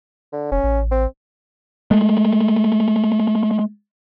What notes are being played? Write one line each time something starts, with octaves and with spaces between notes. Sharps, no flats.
D3
F1 C#4
A1
C4
G#3 A3